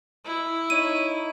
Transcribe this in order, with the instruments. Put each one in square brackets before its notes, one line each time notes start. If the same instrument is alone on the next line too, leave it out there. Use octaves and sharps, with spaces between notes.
[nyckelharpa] E4
[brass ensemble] D#4 C#5 [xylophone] D#7